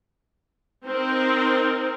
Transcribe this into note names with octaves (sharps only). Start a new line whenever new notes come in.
C4 D#4 A#4